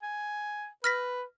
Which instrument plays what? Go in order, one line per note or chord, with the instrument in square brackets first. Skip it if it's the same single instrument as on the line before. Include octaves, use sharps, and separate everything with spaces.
[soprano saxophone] G#5
[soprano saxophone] B4 [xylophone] F6 A#6 B6